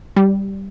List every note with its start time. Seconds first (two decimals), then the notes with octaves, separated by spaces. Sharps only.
0.16 G3